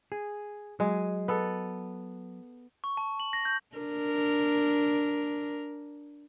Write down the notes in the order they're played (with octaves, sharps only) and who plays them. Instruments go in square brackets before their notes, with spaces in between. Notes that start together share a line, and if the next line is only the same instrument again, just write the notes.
[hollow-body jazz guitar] G#4
[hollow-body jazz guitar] F#3 [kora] G#3
[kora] B3 A4
[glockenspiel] C#6
A5
F#7
A#6
G6
[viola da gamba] D4 A#4